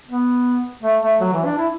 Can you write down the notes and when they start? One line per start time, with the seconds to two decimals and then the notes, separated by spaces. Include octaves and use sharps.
0.09 B3
0.83 A3
1.02 A3
1.21 F#3
1.33 E3
1.45 D4
1.58 E4